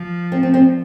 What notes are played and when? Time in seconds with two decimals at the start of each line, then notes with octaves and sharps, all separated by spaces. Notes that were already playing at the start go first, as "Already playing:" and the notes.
Already playing: F3
0.32 C4
0.43 C4
0.54 C4